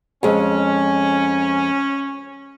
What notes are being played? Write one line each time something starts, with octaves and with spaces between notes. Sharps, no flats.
F2 G#3 C#4